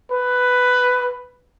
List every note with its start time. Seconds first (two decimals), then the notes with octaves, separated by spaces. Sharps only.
0.11 B4